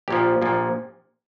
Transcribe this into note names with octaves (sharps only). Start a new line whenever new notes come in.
A#1 A#2 F3 G4
A#1 A#2 F3